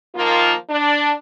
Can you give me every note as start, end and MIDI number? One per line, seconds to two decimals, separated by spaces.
0.16 0.54 51
0.16 0.54 53
0.16 0.54 58
0.16 0.54 65
0.70 1.13 62